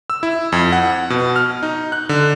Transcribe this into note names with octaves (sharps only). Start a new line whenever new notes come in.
E6
E4
F2
F#5
B2
F6
D#4
F#6
D3